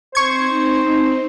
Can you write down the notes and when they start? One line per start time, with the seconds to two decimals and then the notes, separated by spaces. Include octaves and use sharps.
0.15 C4 D#4 C5 C#6 G#6